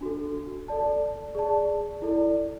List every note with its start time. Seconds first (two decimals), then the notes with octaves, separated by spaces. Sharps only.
0.01 D4 F#4 A4
0.68 A4 D5 A5
1.35 G#4 D5 A5
2.02 E4 A4 D5